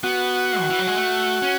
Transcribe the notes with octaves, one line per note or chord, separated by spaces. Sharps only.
B3 F#4
D#3
E3
F#3
G#3
A3
C#4